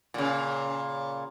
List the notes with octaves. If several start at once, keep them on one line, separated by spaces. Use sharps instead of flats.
A#2 C#3